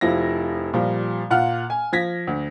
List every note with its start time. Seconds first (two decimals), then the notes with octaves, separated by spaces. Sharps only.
0.01 F1 F3 E4 A#6
0.73 A#2 F3 G3
1.30 A#2 F4 F#5 F6
1.70 G#5
1.92 F3 G#6 A#6 B6
2.27 D2